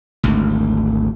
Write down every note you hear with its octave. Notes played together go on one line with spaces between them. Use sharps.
G#1 D2